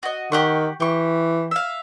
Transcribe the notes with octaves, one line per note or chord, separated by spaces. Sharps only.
F#4 D#5
D#3 G4 F#5 C#6
E3 G4 C#6
E5 F5